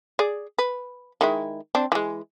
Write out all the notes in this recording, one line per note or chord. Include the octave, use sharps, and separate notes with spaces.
G#4 D5
B4
D#3 G#3 E4
C4 D4
E3 G#3